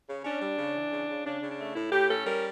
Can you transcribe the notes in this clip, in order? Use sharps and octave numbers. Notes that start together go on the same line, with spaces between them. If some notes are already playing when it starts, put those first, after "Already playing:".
C#3
C#4 D4
G3
C#3
E3
C#3
C#3
C#3 D4
C#3
D4
A3
A2 E4
A2 G4
C#4 A4
G3 A#4